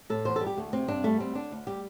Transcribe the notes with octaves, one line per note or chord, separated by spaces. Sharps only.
A2 A4
E2 C5
G3 A4
G4
D2 A3
C3 C4
G2 D4
G3 A3
D2 C4
D3 D4
D2
G3 G4